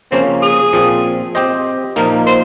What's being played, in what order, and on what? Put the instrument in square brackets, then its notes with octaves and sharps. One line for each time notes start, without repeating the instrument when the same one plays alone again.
[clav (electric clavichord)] C#3 F3 A#3 C#4 [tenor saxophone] C4
[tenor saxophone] G#4
[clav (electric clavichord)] A#2 F3 C4
C4 G4 C5 D#5
[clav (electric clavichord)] A#2 F3 A#3 D#4 [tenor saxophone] A#4
[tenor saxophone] C5